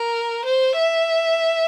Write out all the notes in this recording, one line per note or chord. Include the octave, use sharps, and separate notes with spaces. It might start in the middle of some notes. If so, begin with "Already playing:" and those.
Already playing: A#4
C5
E5